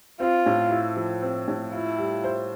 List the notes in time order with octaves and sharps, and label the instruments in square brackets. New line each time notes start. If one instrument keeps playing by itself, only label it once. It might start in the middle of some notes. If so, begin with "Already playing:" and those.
[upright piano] C4 [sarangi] F4
[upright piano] A2
E4
F3
C4
A2
[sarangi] E4 [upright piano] F4
[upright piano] G3
C5